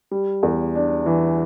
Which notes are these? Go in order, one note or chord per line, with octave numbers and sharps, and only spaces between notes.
G3
E2
D4
E3